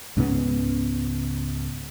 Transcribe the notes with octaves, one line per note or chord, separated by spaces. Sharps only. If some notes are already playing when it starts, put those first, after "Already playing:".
C#2 G#2 C#3 B3